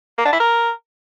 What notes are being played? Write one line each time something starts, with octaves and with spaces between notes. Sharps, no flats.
A#3
D4
E4
A#4